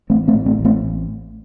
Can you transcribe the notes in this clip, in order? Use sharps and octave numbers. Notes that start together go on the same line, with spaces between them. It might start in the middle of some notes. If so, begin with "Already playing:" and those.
A1 A3 C4
A3 C4
A2
A3 C4
A1
A3 C4